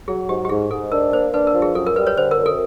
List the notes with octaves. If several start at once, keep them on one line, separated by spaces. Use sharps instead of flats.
F#3 G#4
G#2 G4
G4
G#2 G#4
G#2 A4
D4 A#4
A#3 C5
D4 B4
A#4
F3
G#4
F#2 A4
A#4
G3 B4
B4 C#5
D3 C5
A#4
F#2
A4